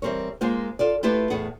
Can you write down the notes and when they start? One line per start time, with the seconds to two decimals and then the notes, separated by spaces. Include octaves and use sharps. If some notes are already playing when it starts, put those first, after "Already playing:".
0.02 E3 G3 C4 A#4 C#5
0.41 G#3 A#3 F4 C5
0.79 F4 A4 D5
1.03 A3 E4 F4 G4 B4
1.30 E2 A2 G#4 F#5